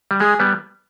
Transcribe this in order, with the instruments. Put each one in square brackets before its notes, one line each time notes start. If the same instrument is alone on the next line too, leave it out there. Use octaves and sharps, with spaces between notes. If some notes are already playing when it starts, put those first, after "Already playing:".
[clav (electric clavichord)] G3
[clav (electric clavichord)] G#3 [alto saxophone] G#4
[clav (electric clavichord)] G3 B3